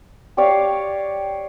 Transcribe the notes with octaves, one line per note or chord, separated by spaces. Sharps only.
G4 C#5 D5 F5